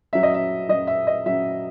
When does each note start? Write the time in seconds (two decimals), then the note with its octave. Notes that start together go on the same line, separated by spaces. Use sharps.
0.13 F#2 F#3 E5
0.23 D#5
0.34 E5
0.69 F#2 F#3 D#5
0.87 E5
1.07 D#5
1.25 F#2 F#3 E5